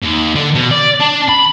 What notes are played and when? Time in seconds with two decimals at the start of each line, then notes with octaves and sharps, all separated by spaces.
0.02 D#2
0.36 D3
0.55 B2
0.71 D5
1.00 D4
1.29 B5